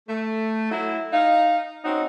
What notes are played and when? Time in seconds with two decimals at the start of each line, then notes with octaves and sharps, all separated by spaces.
0.09 A3
0.71 F#3 A3 E4
1.13 D#4 F5
1.83 C4 C#4 D#4 F#4